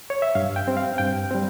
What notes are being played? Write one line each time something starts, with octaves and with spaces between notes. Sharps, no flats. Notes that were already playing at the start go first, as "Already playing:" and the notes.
C#5
E5
G2 F5
G5
G3 C4
F5
G2 G5
G3 C4